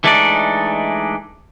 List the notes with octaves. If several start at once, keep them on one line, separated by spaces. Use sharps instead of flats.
E3 G#3 A3 D4 D#4 D5